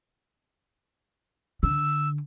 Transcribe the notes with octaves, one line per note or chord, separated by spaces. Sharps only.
D3 E6